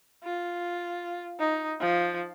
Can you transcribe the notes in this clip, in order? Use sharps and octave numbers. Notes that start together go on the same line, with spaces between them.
F4
D#4
F3